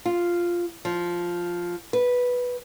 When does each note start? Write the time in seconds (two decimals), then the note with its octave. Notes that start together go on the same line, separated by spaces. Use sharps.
0.05 F4
0.85 F3
1.93 B4